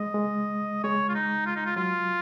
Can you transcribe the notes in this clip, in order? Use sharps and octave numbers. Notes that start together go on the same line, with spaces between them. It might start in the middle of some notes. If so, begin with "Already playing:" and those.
Already playing: G#3 D#5
G#3
G#3 C#5
F4
D#4
F4
D#4
F4
F#3 F4